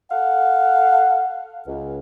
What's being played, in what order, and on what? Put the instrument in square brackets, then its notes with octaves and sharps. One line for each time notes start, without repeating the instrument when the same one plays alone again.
[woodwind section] A4 F5 F#5
C#2